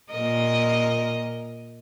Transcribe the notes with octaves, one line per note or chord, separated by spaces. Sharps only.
A#2 A#4 D#5